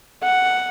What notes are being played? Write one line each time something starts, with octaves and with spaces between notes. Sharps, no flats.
F#5